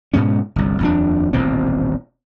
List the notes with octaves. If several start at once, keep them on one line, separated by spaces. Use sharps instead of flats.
G#2 B2 G#3 C#4
G1 C2
D#1 F2 D4
D#1 A1 B2 C4